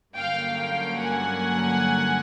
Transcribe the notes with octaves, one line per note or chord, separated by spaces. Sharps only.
G2 D3 F#3 A#3 C#4 F5 G5
F5 G5
F#5 G#5